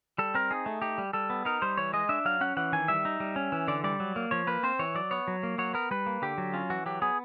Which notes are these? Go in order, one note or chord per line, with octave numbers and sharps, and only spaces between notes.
G3 A4
C4 A#4
D#4 G#4
A3
D#4 G4
G3
G3 A4
B3
D#4 A#4
G3 C5
E3 C#5
G#3 D#5
D4 E5
F#3 F5
C#4 F#5
E3 F#5
D#3 G#5
G3 E5
D#4
G3
C#4
E3
D3 D5
G3 D5
F#3
A#3
F3 C#5
A#3 B4
C4 C5
E3 C#5
F#3 D5
B3 C#5
F#3
A#3
F#3 C#5
B3 A#4
G3 B4
A#3
D3 G4
F#3
C#4 F4
E3 F#4
F#3 G4
B3 G#4